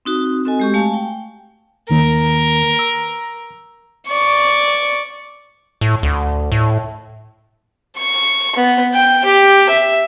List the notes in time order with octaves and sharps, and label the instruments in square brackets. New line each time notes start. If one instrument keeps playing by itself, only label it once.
[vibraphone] C4 D#4 F#4
C4 F#4 A4 D#5 G#5
G#3 G4 C#6
A3 F5 G#5 A5
G5
[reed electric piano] D#2 D#3 A#3 [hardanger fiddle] A#4
[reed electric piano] E6
[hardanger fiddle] D5 C#6
[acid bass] A2
D2
A2
[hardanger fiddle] C#6
B3
G5
G4
E5